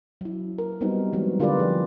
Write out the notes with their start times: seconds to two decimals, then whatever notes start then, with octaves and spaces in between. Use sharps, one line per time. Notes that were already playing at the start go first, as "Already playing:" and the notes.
0.21 F#3 E4
0.58 A#4
0.81 G3 B3 C4 D#4 F#4
1.13 E3 F#3 G#3
1.40 D3 F4 G4 A#4 B4 D5
1.59 F3 G#4